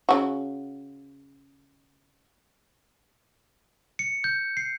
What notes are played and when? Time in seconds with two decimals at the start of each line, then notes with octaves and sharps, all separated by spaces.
0.09 C#3 F#4
3.99 C#7
4.24 G6
4.57 C7